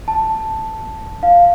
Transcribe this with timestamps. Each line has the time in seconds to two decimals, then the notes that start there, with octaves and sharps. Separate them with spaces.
0.08 A5
1.23 F5